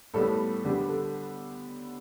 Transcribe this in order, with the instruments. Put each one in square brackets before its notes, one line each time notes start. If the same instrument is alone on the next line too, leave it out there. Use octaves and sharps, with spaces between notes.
[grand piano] A2 G3 B3 A4
D3 G3 B3 G4
A4